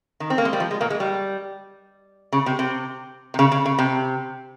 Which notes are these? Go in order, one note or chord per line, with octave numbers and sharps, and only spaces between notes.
D#3
C4
A#3
G#3
G3
F3
G#3
A#2 A#3
G#3
G3
C#3
C3
C3
C3
C#3
C#3
C#3
C3